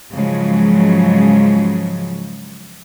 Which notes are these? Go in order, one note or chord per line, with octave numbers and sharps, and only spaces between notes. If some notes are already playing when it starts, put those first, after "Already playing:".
G#2 C#3 F3 F#3 G#3